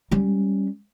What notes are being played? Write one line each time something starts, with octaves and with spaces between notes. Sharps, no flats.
G3 C#4